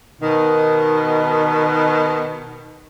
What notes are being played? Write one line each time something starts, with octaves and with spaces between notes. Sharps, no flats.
B2 D#3